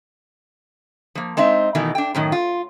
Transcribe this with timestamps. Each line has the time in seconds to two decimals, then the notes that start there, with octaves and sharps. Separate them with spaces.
1.15 F3 A#3
1.37 G#3 C4 D#4 E5
1.75 B2 D#3 E3 A3
1.95 D4 G5
2.15 F#2 A2 D#3
2.32 F4